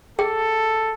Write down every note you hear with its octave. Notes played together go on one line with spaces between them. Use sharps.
G#4 A4 G5